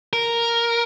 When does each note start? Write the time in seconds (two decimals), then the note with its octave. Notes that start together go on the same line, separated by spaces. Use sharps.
0.13 A#4